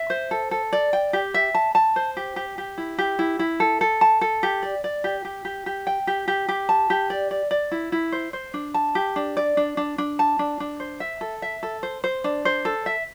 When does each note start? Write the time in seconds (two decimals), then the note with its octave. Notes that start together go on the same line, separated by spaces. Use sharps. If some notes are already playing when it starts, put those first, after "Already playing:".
Already playing: E5
0.10 C5
0.31 A4
0.51 A4
0.73 D5
0.93 G5
1.13 G4
1.34 E5
1.54 A5
1.75 A5
1.96 C5
2.17 G4
2.36 G4
2.58 G4
2.78 E4
2.98 G4
3.19 E4
3.39 E4
3.60 A4
3.81 A4
4.01 A5
4.21 A4
4.43 G4
4.63 D5
4.84 D5
5.04 G4
5.25 G4
5.45 G4
5.66 G4
5.87 G5
6.07 G4
6.28 G4
6.49 G4
6.69 A5
6.90 G4
7.10 D5
7.31 D5
7.51 D5
7.72 E4
7.92 E4
8.12 C5
8.33 C5
8.54 D4
8.74 A5
8.95 G4
9.16 D4
9.37 D5
9.57 D4
9.77 D4
9.98 D4
10.19 A5
10.39 D4
10.60 D4
10.80 C5
11.00 E5
11.21 A4
11.42 E5
11.63 A4
11.83 C5
12.04 C5
12.24 D4
12.45 C5
12.65 A4
12.86 E5